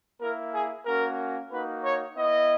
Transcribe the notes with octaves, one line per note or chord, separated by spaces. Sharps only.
A#3 E4 A#4
G#4
A#3 C#4 F#4 A#4
A#3 D#4 F#4 B4
C#5
B3 E4 D#5